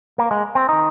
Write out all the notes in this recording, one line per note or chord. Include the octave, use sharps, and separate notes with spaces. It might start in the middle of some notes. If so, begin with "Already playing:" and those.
A#3
G#3
C4
D#3 D#4